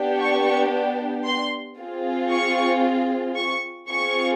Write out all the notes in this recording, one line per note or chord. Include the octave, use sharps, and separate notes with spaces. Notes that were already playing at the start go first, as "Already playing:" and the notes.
Already playing: B3 D4 G4
C#6
C6
C4 F4 G#4
C#6
C#6
C4 F4 G#4 C#6